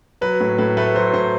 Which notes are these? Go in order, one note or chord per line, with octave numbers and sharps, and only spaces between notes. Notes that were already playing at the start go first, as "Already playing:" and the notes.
F#3 B4
A2
A2 B4
A3 B4
F#3 C5
A2 C5